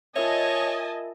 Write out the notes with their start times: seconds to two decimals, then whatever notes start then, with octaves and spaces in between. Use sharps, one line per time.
0.16 F4 A#4 C#5 D#5 E5 G#5 A5